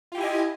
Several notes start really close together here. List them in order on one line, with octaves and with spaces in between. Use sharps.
F4 G4 E4 G#5 D#5